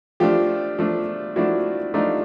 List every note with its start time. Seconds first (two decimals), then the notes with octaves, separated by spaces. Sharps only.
0.20 F3 A3 D4 F4 G4
0.79 F3 A3 D4
1.36 F3 A3 D4 E4 F#4
1.94 F3 A3 D4 D#4 F4